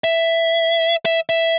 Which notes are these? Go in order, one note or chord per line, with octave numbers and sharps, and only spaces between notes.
E5
E5
E5